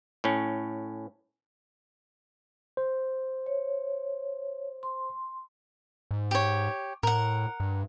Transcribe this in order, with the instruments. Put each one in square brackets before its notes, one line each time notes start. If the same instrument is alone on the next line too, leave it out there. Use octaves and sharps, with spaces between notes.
[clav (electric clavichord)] A2 C#4
[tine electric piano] C5
[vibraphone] C#5
C6
[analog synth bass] G#2
[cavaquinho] G4 C#5
[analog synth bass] A2 [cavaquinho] A#4 F#5
[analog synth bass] G2